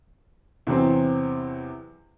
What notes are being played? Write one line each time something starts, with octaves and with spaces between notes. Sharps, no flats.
E2 C3 E3 F#3 C4